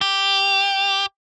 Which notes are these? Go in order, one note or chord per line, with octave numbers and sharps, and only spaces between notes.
G4